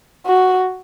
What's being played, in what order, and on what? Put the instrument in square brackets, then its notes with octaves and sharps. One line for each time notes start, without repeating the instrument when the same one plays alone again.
[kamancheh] F#4